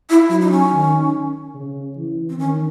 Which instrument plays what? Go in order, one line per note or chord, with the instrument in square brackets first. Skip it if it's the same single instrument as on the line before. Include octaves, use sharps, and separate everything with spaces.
[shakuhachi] E4
[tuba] F#3 [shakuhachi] E4
[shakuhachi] D#4
C#4
[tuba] D#3
C#3
E3
[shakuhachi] C4
[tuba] D#3 [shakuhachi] C#4